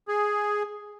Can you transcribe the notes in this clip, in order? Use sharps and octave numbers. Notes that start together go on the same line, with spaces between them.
G#4